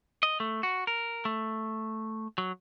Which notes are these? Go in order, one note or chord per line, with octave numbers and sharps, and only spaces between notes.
D#5
A3
F#4
A#4
A3
F#3